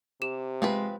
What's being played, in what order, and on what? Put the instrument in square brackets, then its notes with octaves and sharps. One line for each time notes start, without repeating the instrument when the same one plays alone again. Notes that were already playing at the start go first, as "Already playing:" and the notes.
[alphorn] C3 [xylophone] G4 E7
[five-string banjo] F3 C4 B4 [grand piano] G#3